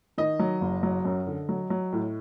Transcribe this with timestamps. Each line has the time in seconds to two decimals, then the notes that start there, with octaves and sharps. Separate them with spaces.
0.18 D#3 D#5
0.39 F#3
0.61 F#1
0.83 F#3
1.05 F#2
1.27 D3
1.49 F#3
1.70 F#3
1.92 A2